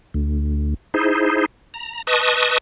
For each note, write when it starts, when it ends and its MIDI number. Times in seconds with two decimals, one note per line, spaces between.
0.14 0.74 38
0.94 1.46 63
0.94 1.46 64
0.94 1.46 68
0.94 1.46 72
1.74 2.02 82
2.07 2.58 71
2.07 2.58 75
2.07 2.58 81
2.07 2.58 85
2.07 2.58 87